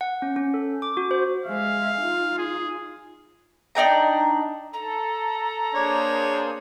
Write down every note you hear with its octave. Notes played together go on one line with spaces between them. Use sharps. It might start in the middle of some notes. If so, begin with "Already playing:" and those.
F#5
C#4
C#4
A4
D6
F#4
C5
G#3 E5 F5
D#4 F4
G#4
D4 D#4 G5 A#5
A4 A#5
A#3 D4 G#4 C5 C#5